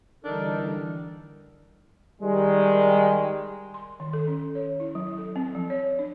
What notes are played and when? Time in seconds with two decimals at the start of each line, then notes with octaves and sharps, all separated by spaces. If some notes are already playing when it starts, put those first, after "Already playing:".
0.25 D3 E3 G3 D4 D#4 A4 A#4
2.22 D#3 G3 G#3
3.74 C6
4.00 D#3
4.13 A4
4.27 C#4
4.55 C#5
4.80 E4
4.95 F#3
5.18 A4
5.36 C4
5.55 F3
5.70 C#5
5.99 D4